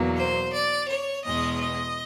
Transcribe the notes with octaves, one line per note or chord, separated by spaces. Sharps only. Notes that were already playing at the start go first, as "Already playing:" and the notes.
Already playing: E2 B2 F#3 A#3
C5
D5
C#5
E2 B2 G#3 D#5
D#5